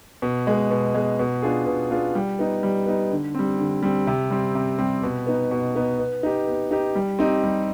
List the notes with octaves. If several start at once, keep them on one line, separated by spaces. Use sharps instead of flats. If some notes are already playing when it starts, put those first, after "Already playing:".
B2
G#3 B3
B2
G#3 B3
B2
B3 D4 F4 G#4
B2
B3 D4 F4 G#4
G3
B3 D#4
G3
B3 D#4
D3
G3 C4
D3
G3 C4
C3
G3 C4
C3
G3 C4
B2
B3 D#4
B2
B3 D#4
B3
D#4 G4
B3
D#4 G4
G3
C4 D#4 G4
G3